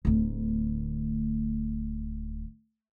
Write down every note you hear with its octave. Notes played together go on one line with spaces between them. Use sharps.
D1 D2